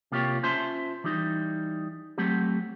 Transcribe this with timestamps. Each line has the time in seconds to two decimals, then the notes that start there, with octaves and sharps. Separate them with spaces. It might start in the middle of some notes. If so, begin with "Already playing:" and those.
0.12 C3 A#3 F4 G4 C#5
0.43 C#4 F4 C5 E5 A5 C6
1.04 E3 G3 D#4
2.18 F#3 A3 C4 G4